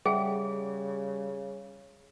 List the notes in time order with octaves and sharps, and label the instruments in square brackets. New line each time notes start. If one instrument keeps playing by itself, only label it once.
[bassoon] C#3 [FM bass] G3 [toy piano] G#4 [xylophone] E5 F#5 G5